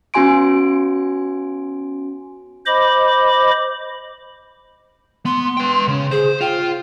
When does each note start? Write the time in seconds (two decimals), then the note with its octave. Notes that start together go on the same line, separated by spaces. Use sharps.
0.14 B3 C#4 F#4 G#5 C6 D7
2.66 C5 D#5 B5 D6
5.25 B3 C6
5.57 B4 G5
5.88 C#3
6.11 G#4 C5
6.41 F4 G5